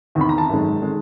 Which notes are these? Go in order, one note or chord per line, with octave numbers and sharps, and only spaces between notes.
E2 C3 D#3
B5
A#5
A5
G#1 F#2 D#3 G#3
D#3 G#3